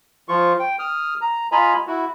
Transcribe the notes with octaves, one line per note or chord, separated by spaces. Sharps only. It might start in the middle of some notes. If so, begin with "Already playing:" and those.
F3 F4 C#6
G5
D#6 F6
A#5
F4 D#5 G#5 A#5 B5
E4 F#4